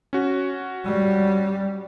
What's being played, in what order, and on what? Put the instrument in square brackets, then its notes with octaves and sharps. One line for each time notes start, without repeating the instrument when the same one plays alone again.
[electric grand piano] C#4 F#4
[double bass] G3